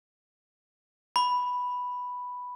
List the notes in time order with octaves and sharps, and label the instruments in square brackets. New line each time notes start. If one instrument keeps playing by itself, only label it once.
[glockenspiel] B5